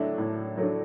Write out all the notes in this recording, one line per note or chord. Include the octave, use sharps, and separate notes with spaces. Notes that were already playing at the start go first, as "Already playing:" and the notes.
Already playing: A2 F#3 A3 D4 E5
A2
F#3 A3 D4